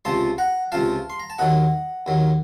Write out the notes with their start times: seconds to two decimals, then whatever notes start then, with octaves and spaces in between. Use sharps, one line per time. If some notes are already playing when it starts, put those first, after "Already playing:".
0.05 C#2 C3 F3 A5 C6
0.38 F#5 A#5
0.72 C#2 C3 F3 F5 A5
1.10 C6
1.20 A#5
1.30 A5
1.38 D#2 D#3 F#3 D#5 F#5
2.06 D#2 D#3 F#3